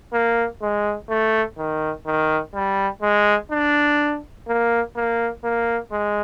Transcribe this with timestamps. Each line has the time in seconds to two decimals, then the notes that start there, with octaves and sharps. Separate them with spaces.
0.13 A#3
0.62 G#3
1.09 A3
1.58 D#3
2.06 D#3
2.54 G3
3.02 G#3
3.51 D4
4.48 A#3
4.96 A#3
5.44 A#3
5.92 G#3